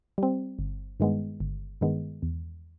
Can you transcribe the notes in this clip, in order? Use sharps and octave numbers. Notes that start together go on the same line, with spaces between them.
G3 C4
G1
G2 D#3 G#3 B3
G1
G2 D#3 G#3 B3
E2